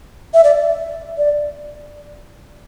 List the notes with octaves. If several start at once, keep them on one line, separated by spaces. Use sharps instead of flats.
E5
D5
D5